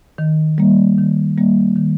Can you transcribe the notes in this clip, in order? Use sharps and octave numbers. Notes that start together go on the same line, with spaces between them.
D#3
G3 A#3
D#3
G3 A#3
D#3